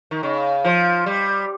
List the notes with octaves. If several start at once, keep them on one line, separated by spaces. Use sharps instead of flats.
D#3
C#3
F3
G3